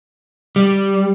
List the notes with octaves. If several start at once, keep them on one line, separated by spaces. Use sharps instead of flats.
G3